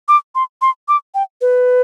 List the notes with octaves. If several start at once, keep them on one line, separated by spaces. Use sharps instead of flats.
D6
C6
C6
D6
G5
B4